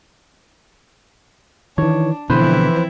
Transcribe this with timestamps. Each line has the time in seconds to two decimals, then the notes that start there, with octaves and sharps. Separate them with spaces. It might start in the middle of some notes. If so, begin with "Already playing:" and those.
1.78 D#3 E3 D4 C#5
2.30 B2 D3 E3 F3 C4 E4 B4 C5